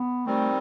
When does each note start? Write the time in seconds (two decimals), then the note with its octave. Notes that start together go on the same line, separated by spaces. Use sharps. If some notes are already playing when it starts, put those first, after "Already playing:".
Already playing: B3
0.26 D#3 G3 A3 C4